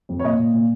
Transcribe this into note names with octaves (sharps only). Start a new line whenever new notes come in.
F2
C#5
A#2 D#5
A#2
A#2